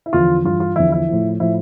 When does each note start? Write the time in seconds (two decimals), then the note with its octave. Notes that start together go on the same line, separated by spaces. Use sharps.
0.06 E4
0.13 E2 D3 F3 F4
0.45 G2 E3 F4
0.60 F4
0.76 E2 D3 F3 E4
0.92 E4
1.09 A2 F3
1.40 A2 F3 E4